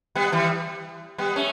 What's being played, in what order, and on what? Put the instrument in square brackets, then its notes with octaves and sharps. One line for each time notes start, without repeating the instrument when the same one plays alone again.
[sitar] G3 B3
E3 G3
G3 B3
A3 C#4